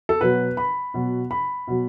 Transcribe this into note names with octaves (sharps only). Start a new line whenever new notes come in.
A4
B2 F#3 B4
B5
B2 F#3
B5
B2 F#3